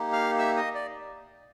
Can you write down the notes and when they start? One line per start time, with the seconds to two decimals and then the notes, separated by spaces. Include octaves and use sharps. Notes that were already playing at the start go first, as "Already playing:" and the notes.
Already playing: A#3 D#4 G4
0.12 F5 F6
0.39 E5 E6
0.56 D#5 D#6
0.74 D5